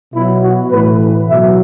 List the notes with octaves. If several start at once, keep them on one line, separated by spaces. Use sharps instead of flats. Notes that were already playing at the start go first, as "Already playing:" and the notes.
B2 F#3 E4
F#4
A2 E3 B4
B2 F#3 E5